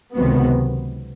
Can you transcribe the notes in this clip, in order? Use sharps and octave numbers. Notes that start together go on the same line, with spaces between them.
C#2 C3 D#3 F#3 B3